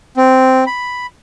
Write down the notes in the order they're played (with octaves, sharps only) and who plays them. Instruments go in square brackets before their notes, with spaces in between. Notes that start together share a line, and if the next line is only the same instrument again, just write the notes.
[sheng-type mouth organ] C4
B5